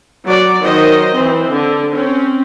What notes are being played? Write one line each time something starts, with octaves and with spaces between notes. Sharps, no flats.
F#3 D5
D#3 F#3 C5 D#5
E3 C4 C5
D3
C4 C#4